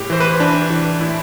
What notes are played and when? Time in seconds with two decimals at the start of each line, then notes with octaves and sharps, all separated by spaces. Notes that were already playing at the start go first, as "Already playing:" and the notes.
Already playing: A2 G4
0.10 E3 C5
0.20 B4
0.39 E3 D4
0.70 E3
1.01 A2 E4